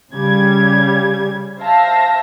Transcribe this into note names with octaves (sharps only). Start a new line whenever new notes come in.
C#3 G3 G#6
C5 E5 F5 A5 A#6